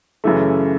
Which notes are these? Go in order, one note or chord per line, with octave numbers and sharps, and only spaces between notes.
F#2 C#3 E3 A3